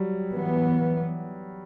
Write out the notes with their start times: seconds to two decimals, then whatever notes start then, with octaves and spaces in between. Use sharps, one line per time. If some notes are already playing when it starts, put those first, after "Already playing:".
Already playing: F#3 G3
0.30 E3 B3